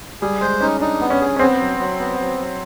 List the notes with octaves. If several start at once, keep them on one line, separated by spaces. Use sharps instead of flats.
G3 G#4
G#3 C5
C#4 D#4
D4 D#4
B3
C#4
G#4
C#4
B3 C4
F#3
F#3
B3
F#3
F#3